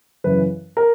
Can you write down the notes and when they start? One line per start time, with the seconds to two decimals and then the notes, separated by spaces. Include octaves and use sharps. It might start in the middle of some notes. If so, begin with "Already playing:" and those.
0.24 F#2 C#3 E3 B4
0.77 A#4